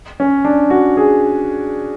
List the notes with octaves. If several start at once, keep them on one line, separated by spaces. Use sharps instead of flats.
C#4
D4
F#4
G#4